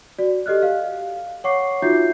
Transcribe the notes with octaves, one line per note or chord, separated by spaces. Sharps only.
F#4 D5
G4 A4 D#5 F6 F#6
F5
C#5 F#5 C#6 D6 C7
D#4 F4 F#4 E5 G6 C7